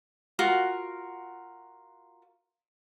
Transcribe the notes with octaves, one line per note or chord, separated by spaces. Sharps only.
F4 F#4 A#4